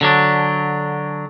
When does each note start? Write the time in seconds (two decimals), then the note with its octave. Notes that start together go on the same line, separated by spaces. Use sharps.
0.01 D3 F#3 D4